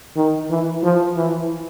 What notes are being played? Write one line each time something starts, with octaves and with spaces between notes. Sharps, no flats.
D#3
E3
F3
E3